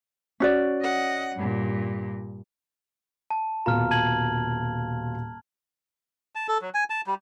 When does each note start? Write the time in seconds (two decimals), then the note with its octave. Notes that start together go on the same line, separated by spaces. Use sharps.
0.40 C#4 F#4 D5
0.82 D#5 F#5
1.36 G2 A#2
3.30 A5
3.66 D#1 B2 F4 A#5 F6
3.91 A5 G#6 F#7
6.35 A5
6.48 A4
6.62 F#3
6.74 G#5
6.90 A5
7.07 G3